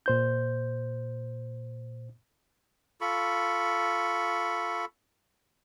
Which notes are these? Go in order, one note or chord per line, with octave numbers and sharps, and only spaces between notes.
A#2 C5 G6
F4 A4 B5 C#6